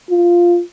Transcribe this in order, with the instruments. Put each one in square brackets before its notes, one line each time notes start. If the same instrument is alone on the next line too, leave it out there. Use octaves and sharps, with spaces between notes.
[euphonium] F4